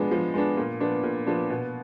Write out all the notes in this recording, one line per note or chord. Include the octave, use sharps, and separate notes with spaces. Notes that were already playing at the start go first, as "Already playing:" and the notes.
Already playing: F3 G#3 B3 D4
F3
G#3 B3 D4
A#2
F3 B3 D4
A#2
F3 B3 D4
B2